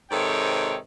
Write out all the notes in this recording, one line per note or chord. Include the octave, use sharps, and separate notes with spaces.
G#2 C3 D#3 A4 C#5 G5